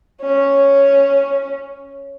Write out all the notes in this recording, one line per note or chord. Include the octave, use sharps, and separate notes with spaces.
C#4